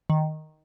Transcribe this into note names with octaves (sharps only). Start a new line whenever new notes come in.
D#3